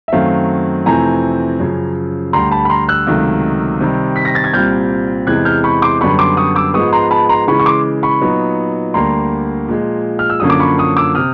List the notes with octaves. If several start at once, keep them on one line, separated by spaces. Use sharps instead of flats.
E5
F#2 D#3 F#3 A3 C4 F5
F2 C3 E3 A3 C4 G#5 A#5
F#2 C#3 F3
D2 D3 G3 A#5 C6
A5 B5
B5
A#5 C6
E6 F#6
C#2 C3 D#3 F#3 A3
C3 D#3 G3
B6
A#6
A6
G#6
C2 A#2 G3 C4 F6 G6
E2 C3 E3 G#3 F#6 G#6
F6 G6
B5 C#6
C6 D6
F#2 D3 G3 B3 B5 C#6
C6 D6
C#6 D#6
D6 E6
G#2 F3 G#3 B3 C#6 D#6
A#5 C6
A5 B5
A#5 C6
C#3 E3 G#3 B5 C#6
C#6
C6 D6
B5 C#6
A#2 F#3 B3 D#4
D2 D3 G3 A#3 A#5 C6
A#2 F3 G#3
F6
E6
F#2 D3 F3 A#3 C#4 D#6
D6
B5 C#6
C#6 D#6
D6 E6
C3 D#6 F6